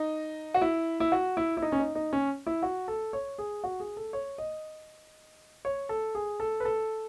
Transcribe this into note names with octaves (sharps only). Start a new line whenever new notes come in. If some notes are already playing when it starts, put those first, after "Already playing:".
Already playing: D#4
F#4
E4
E4
F#4
E4
E4
D#4
C#4
D#4
D#4
C#4
E4
F#4
A4
C#5
G#4
F#4
G#4
A4
C#5
D#5
C#5
A4
G#4
A4
B4
A4